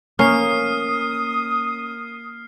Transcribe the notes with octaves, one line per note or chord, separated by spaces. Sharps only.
A#3 C#4 D#6 F6 C7